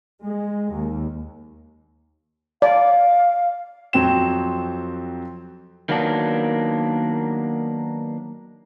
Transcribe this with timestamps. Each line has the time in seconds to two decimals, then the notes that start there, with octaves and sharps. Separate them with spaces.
0.23 G#3
0.70 D#2
2.62 D5 F5
3.93 F2 F#3 C4 G5 E7
5.89 D#3 F#3 A#3 B3 D4